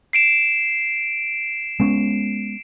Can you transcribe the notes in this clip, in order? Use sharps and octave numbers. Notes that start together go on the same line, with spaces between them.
C7 D7 E7
G#3 B3 C#4